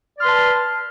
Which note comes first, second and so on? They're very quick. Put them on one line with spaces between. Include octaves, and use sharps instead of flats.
D5 F6 C6 B4 A5